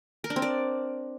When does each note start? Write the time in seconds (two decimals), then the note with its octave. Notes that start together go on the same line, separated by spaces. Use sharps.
0.24 A#4
0.30 D4
0.36 C4
0.42 D5